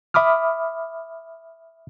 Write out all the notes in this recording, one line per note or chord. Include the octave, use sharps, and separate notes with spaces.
E5 B5 D6 D#6 F6